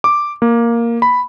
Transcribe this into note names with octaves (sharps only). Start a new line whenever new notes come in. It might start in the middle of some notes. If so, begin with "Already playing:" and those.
D6
A#3
B5